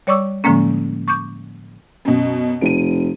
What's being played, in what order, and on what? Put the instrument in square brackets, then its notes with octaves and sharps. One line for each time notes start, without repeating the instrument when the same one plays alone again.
[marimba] G3 C#5 D5 C#6 D6 E6
A2 D3 F3 G#3 A#3 C#4
C#6 D6 G6
[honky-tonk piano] F#2 B2
[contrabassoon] F1 [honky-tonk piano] D7 D#7